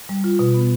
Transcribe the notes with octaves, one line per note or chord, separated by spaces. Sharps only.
G3
F4
B2
B3